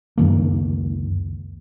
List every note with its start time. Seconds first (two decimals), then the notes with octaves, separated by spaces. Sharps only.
0.18 C#2 F#2 D#3 A#3